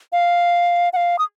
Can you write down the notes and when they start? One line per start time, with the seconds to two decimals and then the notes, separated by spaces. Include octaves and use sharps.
0.13 F5
0.93 F#5
0.96 F5
1.19 D#6